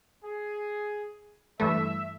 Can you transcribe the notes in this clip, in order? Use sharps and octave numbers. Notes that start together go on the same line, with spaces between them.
G#4
G2 E3 A3 E5